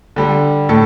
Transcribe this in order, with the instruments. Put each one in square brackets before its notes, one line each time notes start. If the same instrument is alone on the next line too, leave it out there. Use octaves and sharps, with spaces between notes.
[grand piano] D3 G3
A2 A4